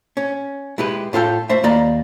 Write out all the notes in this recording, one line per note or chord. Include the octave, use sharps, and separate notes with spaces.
C#4
G#3 E4 G4 B4
A2 F4 A4 G5
A3 C5 E5
D#2 A#3 D5 D#5 A#5